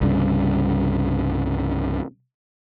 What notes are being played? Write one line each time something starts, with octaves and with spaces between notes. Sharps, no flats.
C2 G2 C#3